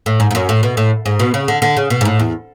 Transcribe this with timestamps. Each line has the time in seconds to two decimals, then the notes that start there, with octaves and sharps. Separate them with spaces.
0.06 A2
0.20 G#2
0.31 G#2
0.35 F#2
0.49 A2
0.63 B2
0.77 A2
1.06 G#2
1.19 B2
1.34 C#3
1.48 D3
1.62 D3
1.77 C#3
1.90 B2
2.01 G#2
2.05 A2
2.19 E2